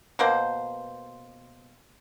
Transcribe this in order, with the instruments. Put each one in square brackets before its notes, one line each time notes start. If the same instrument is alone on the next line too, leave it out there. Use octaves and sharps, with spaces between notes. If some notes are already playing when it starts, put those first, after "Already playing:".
[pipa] B2 A#3 C5